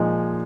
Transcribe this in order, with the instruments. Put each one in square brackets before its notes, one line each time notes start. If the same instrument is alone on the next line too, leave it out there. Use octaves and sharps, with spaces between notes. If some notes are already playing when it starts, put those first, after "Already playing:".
Already playing: [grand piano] A#2 F3 G#3 D#4